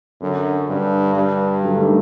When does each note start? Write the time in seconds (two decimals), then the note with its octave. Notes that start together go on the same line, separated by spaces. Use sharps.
0.21 F#2 D3
0.69 G2 D3
1.15 G2
1.63 D3 F#3
1.75 A3
1.79 D#3 G3